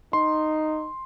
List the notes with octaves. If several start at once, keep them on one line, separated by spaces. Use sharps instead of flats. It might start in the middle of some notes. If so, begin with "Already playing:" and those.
D#4 C6